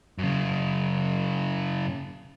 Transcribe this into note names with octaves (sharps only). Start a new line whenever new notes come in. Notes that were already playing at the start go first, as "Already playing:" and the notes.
F#2 C#3